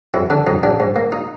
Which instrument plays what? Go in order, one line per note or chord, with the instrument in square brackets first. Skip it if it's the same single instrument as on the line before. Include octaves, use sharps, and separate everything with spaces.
[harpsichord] F2 E4
D3 D4
F2 D#4
A1 D4
G#2
A#3
D#4